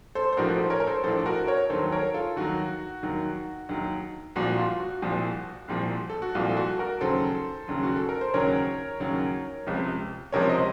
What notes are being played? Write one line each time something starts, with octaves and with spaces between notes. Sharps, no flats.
A4 C5
C5
A#1 A2 F3 F#4 A#4
A4 C5
A#4 C#5
A#4
A4 C5
A#1 A2 F3 A4 C5
F#4 A#4
A#4 C#5
D#2 D#3 F#3 A4 C5
A#4 C#5
F4 A4
D#2 D#3 F#3 F#4
D#2 D#3 F#3
D#2 D#3 F#3
C2 A#2 F3 F#4
F4
F#4
C2 A#2 F3
C2 A#2 F3
A4
F#4
C2 A#2 F3 F4
A4
F#4
F#4 A#4
D#2 C#3 F#3 A4 C5
D#2 C#3 F#3
F#4
A4
A#4
C5
D#2 C#3 F#3 A#4 C#5
D#2 C#3 F#3
C#2 C3 F3
C#2 C3 F3 A#4 C#5
C5 D#5